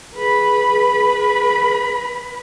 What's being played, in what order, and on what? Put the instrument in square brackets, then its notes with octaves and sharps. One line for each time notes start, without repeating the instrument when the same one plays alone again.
[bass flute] G#4 [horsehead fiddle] B4 B5